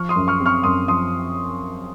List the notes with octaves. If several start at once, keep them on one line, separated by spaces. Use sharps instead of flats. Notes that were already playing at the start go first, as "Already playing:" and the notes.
Already playing: F3 C#6 F6
C6 D#6
F#2
C#6 F6
C4
C#6 F6
F#2 C6 D#6
F3 C6 D#6